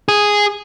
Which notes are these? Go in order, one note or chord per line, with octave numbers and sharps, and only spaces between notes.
G#4